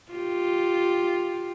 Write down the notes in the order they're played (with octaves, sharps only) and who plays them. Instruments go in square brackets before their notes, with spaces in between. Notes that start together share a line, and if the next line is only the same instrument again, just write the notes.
[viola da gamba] F4 G4